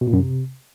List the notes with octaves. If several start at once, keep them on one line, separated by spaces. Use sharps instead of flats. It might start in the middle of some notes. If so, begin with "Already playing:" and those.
B2
A#2
F#2
C3